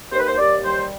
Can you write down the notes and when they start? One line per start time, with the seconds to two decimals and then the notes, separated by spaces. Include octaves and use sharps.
0.12 D#2 C5
0.19 B4
0.27 C5
0.38 D#2 D5
0.64 G3 C5